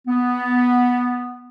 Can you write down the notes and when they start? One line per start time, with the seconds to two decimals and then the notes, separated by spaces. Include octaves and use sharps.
0.07 B3